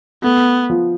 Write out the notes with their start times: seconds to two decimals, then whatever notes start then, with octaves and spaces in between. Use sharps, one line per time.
0.23 A3 B3
0.70 F3